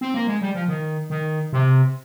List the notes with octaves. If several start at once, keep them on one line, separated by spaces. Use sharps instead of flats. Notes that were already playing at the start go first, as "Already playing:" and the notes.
C4
A#3
G#3
G3
F3
D#3
D#3
C3